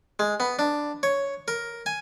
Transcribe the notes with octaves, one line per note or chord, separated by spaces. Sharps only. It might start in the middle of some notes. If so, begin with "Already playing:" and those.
G#3
B3
D4
C#5
A#4
G#5